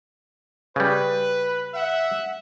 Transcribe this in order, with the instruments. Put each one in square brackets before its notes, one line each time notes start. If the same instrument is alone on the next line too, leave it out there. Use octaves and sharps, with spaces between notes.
[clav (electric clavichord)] C#3 G3 [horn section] B4
[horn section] E5 F#5